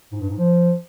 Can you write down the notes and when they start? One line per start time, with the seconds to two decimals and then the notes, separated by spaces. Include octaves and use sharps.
0.12 G#2
0.20 G2
0.29 G#2
0.37 F3